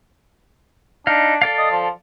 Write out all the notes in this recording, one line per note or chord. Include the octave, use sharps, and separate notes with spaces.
D4 D#4 F5
A4 D5 F5
D#5
F3